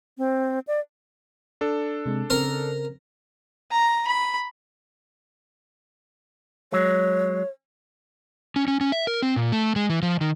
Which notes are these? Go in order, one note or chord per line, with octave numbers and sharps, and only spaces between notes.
C4
D5
D4 A4
C3 G#3
C#3 C4 A#4
A#5
B5
F#3 G#3 C#5
C#4
C#4
C#4
E5
A#4
C4
A#2
A3
G#3
E3
F3
D#3